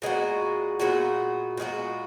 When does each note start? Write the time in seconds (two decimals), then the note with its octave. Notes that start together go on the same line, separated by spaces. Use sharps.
0.02 A#2 G#3 B3 F#4
0.80 A#2 G#3 B3 F#4
1.57 A#2 G#3 B3 F#4